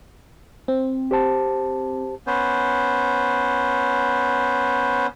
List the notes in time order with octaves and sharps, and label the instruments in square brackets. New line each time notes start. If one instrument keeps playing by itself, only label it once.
[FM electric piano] C4
[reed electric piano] G4 C5 A5
[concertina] B3 C#4 C5